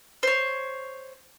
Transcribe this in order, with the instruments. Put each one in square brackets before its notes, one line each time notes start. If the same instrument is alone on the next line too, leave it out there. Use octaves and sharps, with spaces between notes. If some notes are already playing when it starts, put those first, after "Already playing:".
[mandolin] C5 C#5